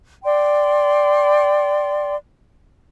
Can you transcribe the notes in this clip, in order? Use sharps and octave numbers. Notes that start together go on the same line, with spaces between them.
D5 G5 C6